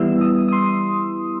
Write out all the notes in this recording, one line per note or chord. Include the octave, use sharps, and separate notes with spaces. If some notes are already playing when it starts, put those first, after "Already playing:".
Already playing: E3 G3 B3 E4 E6
D#6
D#6
C6